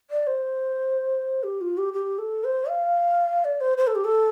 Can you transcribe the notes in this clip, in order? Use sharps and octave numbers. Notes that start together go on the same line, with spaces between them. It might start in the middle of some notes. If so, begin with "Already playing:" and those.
D5
C5
G4
F4
G4
G4
A4
C5
F5
D5
C5
C5
A4
G4
A4